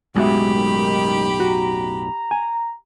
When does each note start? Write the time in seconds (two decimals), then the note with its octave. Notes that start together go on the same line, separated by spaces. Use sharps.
0.16 B1 F#2 A2 G#3 F#4 G4 E5 B5
0.52 D#3
1.40 F#4 A#5
2.31 G#5